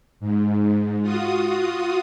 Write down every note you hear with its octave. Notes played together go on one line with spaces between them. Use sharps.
G#2
F4 F#4 D#6